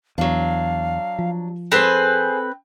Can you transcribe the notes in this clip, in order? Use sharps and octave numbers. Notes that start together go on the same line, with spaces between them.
E2 F#3 D4 F5
F3
C4 G#4 A4 B4 C5 G#5